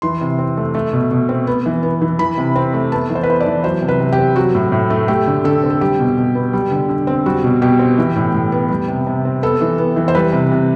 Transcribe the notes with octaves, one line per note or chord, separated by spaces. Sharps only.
E3 C6
C3
C4
A3
A3
B2
B2
C4
B3
E3
B3
E3
E3 B5
C3
C4
A3
B3 A5
E3
C5
B4
B3 C5
D5
E3
F#3 C5
C3
B4
C3
G4
C4
F#3 F#4
A2
A2
A3
A3 G4
D3
D3 A4
C4
A4
G3 G4
B2
B2
B3
G3
D3
D3
C4
G3 F#4
B2
B2 G4
C4
E3
A2
A2
B3
G3
C3
C3
C4
B3 A4
E3
B3
E3
C5
G3 B4
C3
C3